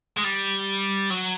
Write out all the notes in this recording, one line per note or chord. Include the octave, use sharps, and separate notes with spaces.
G#3
G3
F#3